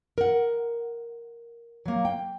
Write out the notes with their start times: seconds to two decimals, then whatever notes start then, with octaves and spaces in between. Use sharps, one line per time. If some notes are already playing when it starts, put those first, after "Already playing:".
0.18 A#4 F#5
1.86 F#3 A#3
2.05 G5